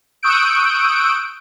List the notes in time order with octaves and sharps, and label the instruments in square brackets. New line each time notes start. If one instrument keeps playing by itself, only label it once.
[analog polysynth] C#6 D#6 E6 F#6 G6 D7